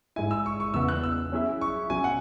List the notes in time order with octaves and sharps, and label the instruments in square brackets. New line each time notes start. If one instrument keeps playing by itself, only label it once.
[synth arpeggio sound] G#2 G#3 E4 [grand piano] G#5
[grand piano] E6
C#6
C#6
[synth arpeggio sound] E2 C#3 E3 B3 [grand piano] E6
[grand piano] F#6
E6
[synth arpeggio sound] F#3 C#4 E4 G#4 E5
[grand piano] C#6
[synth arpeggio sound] B2 F#3 C#4 F#4 [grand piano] G#5
[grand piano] F#5